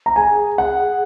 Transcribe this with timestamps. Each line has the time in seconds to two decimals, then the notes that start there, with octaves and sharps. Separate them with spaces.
0.06 A#5
0.16 G#4 G#5
0.58 F#5